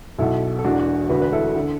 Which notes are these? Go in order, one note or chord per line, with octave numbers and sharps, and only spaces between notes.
B1 B2 E4 A4
A4
E1 E2 B2 D4 F#4
D4 F#4
E1 D2 D3 F#4 B4
B4
E4 A4
D3